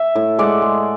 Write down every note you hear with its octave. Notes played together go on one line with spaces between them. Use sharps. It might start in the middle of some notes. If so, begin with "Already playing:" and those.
Already playing: E5
A2
G#3 D5 F#5
G#3